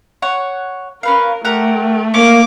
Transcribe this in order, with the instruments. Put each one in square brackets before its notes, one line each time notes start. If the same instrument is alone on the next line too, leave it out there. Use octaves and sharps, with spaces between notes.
[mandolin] C#5 F#5
[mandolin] C#4 B4 F5 [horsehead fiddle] A#4
[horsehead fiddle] A3 [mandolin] G4 A#4 F#5
[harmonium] A#3 [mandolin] C#4 [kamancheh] D6